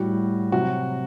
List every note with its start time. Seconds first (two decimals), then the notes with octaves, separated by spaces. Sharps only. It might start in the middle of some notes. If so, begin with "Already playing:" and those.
Already playing: A2 G3 F#4
0.52 C3 F#3 F#4